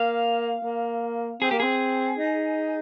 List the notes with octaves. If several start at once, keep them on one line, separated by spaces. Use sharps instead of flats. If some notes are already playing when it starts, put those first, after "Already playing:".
Already playing: A#3 F5
A#3
C4 G#4
A#3 G4
C4 G#4
D#4